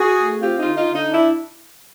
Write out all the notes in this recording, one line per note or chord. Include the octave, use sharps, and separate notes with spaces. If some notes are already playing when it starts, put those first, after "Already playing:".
Already playing: F#4 G#4
A3
C4 F4 G4
D#4 F4
D3
D#4 F4
D3
D#4
D4 E4